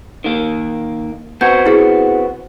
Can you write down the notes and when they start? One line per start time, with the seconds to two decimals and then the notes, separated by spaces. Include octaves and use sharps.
0.24 D#3 A#3
1.41 B3 C4 F#4 G6 G#6
1.66 E4 G#4 F#5